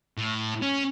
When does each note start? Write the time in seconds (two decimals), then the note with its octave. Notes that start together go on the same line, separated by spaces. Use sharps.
0.18 A2
0.62 C#4